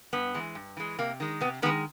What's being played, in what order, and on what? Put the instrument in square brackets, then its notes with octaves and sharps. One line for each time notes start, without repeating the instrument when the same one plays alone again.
[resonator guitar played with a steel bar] G2 B3
E3 G#3
G2
E3 G#3
C3 A#3
D#3 G#3
C3 B3
D#3 B3
G#3